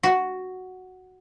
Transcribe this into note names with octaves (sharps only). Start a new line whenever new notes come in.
F#4